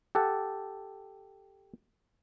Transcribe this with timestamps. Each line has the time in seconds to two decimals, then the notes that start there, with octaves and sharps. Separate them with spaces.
0.15 G4 A4 F#5 A5